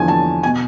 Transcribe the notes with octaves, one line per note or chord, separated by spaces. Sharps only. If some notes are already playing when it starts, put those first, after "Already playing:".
Already playing: E2 D3 F3 G#5
A5
B2 G#5